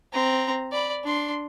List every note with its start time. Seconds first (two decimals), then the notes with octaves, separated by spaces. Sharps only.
0.13 C4 A#5
0.72 D5 B5
1.03 D4 C6